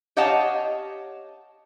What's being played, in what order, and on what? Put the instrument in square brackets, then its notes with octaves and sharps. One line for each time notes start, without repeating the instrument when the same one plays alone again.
[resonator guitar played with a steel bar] G4 C#5 D#5 F5 F#5 A5